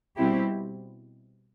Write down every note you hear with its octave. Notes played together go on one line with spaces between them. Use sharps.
B2 G3 C4 E4 G4